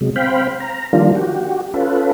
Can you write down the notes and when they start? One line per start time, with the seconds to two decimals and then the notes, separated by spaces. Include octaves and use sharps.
0.01 C3 F#3 G#3
0.16 C4 C5 F5 G5 B5
0.60 A#5
0.93 D#3 F3 G3 A#3 D4 F4
1.15 F#4 G4
1.74 C#4 F4 A4 B4